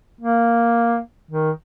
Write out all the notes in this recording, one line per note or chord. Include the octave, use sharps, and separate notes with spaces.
A#3
D#3